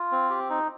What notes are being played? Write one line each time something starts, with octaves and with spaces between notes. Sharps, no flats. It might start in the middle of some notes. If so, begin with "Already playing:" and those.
Already playing: F4
C4
G4
D#4